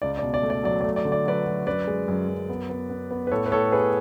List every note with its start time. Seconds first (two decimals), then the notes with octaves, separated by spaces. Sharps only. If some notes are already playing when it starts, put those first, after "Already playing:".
0.02 C#2 D5
0.18 D5
0.23 B2
0.34 D5
0.43 A3
0.50 D5
0.64 F#3 D5
0.81 D5
0.84 A3
0.96 D5
1.05 D3
1.12 D5
1.25 F#3 B4 D5
1.46 F#3
1.67 F#2 B4 D5
1.87 G#3
2.08 F#2
2.28 F#2
2.49 B3
2.70 B3
2.90 B3
3.11 B3
3.27 B4
3.31 A2 A4 C#5
3.46 B4
3.52 A2 A4 C#5
3.72 B3 G#4 B4